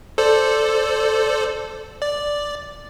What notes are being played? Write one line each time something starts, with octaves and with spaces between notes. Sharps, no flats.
A4 C5 D5
D5